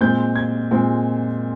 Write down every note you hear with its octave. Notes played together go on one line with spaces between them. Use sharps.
A#2 G#3 C4 G6
G#6
A#2 G#3 C4